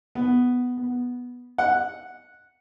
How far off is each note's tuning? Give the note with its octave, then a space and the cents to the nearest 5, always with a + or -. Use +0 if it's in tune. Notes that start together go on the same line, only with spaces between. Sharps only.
B3 +5
B3 -5
F#5 -5